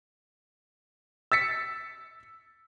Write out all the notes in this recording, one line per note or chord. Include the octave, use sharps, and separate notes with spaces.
E6 A6 B6 C#7